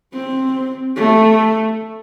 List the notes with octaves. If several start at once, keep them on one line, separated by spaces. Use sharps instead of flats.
C4
A3